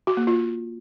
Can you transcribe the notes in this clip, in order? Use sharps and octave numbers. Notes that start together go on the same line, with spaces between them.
F#4
A#3
F4